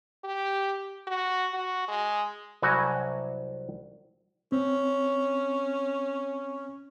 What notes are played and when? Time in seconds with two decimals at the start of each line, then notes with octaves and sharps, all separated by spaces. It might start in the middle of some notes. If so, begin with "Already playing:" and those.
0.24 G4
1.07 F#4
1.54 F#4
1.88 G#3
2.62 C2 F#3 G3 F#4 G#5 A5
4.52 C4 C#4